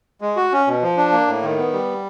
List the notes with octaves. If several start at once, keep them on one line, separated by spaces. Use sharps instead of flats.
G#3
F#4
C#4
B2
F3
D4
A#3
A2
D#3
B3
G3